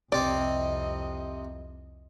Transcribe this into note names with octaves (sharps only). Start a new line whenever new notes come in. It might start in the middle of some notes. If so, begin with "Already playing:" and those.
C2 F2 C3 C4 D5 D#5